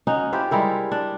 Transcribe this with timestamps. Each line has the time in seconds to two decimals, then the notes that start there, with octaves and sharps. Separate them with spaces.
0.07 C#4 D#4 F#4
0.32 E4 F4 G4 C5
0.51 G3 G#3 E4 A#4
0.92 D4